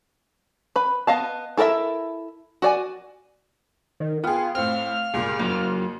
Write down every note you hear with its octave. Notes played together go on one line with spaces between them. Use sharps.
B4 B5
B3 D#5 F5 A5
E4 A4 A#4 D#5 E5
F#4 D5 G#5
D#3
B3 F4 G#4 G5
A2 C4 F5 F6
C#2 G2 A#2 G#4
F2 F#3 A#3